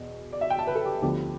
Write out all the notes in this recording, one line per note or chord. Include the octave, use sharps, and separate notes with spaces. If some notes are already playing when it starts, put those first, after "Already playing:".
Already playing: E2 B2
D5
E5
G5
A5
B4
A4
G4
D2 D3 F3 B3 G4